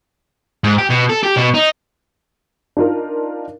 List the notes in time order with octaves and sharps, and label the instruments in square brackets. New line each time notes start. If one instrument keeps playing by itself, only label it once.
[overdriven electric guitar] G#2
G4
B2
A4
G4
B2
D#4
[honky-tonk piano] D4 D#4 F4 A#4